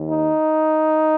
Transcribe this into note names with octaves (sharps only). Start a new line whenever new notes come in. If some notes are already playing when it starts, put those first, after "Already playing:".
Already playing: D#2 D#3
D#4